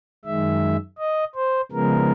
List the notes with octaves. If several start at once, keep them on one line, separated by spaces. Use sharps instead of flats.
F#2 D#3 G#3 E5
D#5
C5
C#3 F3 G#3 B3 A#4